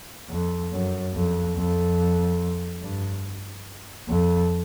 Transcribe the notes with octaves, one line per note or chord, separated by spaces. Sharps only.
F2
F#2
F2
F2
G2
F2